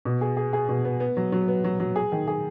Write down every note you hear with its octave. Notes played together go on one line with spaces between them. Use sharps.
B2
G#4
G#4
G#4
B2
B3
B3
F#3
F#3
B3
F#3
F#3
G#4
D#3
G#4